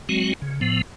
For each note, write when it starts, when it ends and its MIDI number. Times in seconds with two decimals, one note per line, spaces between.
0.09 0.33 54
0.09 0.33 56
0.09 0.33 60
0.09 0.33 66
0.42 0.60 49
0.61 0.82 45
0.61 0.82 53
0.61 0.82 59